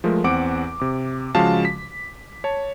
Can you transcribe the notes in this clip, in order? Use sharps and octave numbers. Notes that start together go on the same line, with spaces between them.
F3 G#3 A3 A#4
E2 C4 F#5 D6 D7
C3 D6
C#3 F3 G#3 F#4 F5 A5
B6
C#5 A5